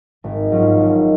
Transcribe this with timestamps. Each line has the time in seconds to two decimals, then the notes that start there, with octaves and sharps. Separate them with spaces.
0.24 G#1
0.51 G#2 F#3 C#4 F4
0.79 G#1